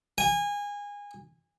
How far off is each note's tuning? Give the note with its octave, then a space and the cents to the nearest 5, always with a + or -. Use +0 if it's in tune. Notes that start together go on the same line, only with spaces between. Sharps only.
G#5 -25